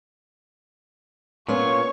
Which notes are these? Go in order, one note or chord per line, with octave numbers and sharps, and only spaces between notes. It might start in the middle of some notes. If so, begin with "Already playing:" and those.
A#2 B3 C#4 F4 C#5